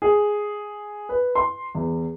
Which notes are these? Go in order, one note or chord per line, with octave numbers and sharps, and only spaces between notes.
G#4
B4
C6
E2